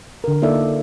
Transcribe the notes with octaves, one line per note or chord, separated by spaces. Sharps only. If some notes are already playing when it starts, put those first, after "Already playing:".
D3 A#4
A#3 D#4 F4 A4 D5 E5